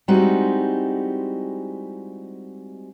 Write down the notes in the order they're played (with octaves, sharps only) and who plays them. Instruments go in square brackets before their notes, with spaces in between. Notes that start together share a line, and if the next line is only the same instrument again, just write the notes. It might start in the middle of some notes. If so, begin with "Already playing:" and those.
[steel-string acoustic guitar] G3 G#3 C4 D#4 E4 F#4